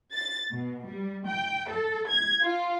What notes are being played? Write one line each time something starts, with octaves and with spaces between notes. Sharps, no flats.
A6
B2
G3
G5
A4
G#6
F4